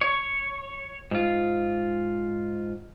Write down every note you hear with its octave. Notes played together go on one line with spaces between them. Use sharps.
C#5
G#2 F4